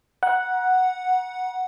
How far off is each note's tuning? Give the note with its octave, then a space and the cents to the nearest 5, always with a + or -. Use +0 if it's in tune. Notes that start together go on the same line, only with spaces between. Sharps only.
F#5 +0 A#5 +40